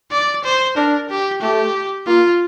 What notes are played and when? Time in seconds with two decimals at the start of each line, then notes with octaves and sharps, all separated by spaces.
0.12 D5
0.44 C5
0.77 D4 A#4
1.09 G4
1.41 A3 G4
2.07 A#3 F4